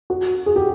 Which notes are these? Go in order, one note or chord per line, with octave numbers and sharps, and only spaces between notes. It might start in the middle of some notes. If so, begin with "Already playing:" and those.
F#4
G#4
G4